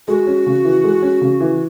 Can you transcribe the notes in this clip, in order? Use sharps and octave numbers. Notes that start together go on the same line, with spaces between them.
G#3 F#4
C#4
C#3
E3
G#3
C#4
C#3
E3